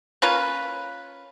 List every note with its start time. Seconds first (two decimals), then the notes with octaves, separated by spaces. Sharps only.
0.22 A#3 C#4 F4 B4